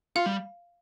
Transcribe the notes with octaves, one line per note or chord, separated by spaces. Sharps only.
F4 F5
G3